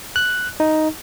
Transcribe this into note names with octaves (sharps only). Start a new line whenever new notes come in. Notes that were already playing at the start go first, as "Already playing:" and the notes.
F#6
D#4